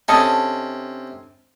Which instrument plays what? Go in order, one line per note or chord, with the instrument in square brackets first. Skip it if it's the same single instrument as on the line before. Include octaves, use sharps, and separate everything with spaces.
[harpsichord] C3 C#4 [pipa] D4 A4 D#5